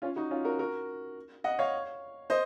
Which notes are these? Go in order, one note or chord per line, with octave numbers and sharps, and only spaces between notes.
C#4 F4
D#4 F#4
C#4 F4
F#4 A#4
F#4 A#4
D#5 F#5
C#5 F5
C5 D#5